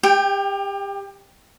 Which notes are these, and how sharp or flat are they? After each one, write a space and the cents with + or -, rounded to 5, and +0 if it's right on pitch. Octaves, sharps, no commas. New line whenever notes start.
G4 +30 G5 +0